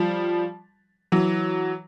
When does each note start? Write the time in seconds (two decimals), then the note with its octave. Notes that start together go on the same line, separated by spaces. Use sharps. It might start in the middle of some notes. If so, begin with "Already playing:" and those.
Already playing: F3 G3
1.12 E3 F#3